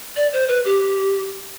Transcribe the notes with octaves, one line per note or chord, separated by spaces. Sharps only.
D5
C5
B4
G4